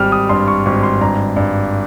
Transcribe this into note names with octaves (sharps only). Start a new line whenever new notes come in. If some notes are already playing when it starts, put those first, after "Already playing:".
Already playing: G#1 G3 F6
D#6
G2 C6
C#6
G#1 C#6
C6
G2 A#5
G2